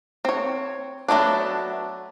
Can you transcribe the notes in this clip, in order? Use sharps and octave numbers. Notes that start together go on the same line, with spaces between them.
C4 C#5
F#3 A3 B3 D4